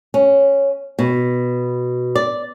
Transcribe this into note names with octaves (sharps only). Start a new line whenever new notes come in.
C#4
B2
D5